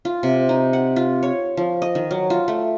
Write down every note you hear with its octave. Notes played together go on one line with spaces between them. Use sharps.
F4
C3
D#4
F#5
F4
C#5
F3
D#5
D#3
F#3
F4
A3